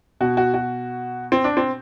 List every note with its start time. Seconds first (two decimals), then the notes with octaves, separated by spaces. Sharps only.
0.20 B2 F#4
0.37 F#4
0.54 F#4
1.32 C4
1.44 D4
1.57 C4